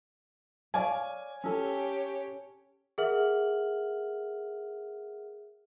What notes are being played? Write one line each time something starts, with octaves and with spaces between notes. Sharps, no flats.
C#5 D5 F5 G#5
C#4 G4 A4 C#5
G#4 A#4 E5 F#5 F6 F#7